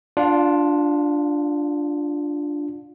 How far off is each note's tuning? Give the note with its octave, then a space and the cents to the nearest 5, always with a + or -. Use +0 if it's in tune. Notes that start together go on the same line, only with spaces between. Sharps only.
D4 +0 F4 +0 F5 +40